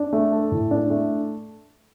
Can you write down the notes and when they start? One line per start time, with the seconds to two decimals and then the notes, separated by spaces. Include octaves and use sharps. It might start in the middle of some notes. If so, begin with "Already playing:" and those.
Already playing: D4
0.13 A3
0.32 A4
0.52 A2
0.71 D4
0.90 A3